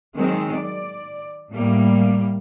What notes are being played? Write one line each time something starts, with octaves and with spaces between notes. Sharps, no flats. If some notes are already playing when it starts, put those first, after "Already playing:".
D#3 F#3 G#3 C4
D5
A2 G3 A#3